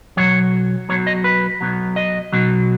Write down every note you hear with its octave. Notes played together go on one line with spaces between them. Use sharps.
B1 B2 F#3 C#5
B1 B2 F#3 C#5
D#5
B4
B1 B2 F#3
D#5
B1 B2 F#3